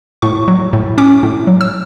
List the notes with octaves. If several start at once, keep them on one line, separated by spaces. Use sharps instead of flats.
A2 C#6
F#3
A2
C#4 D6
A2
F#3
E6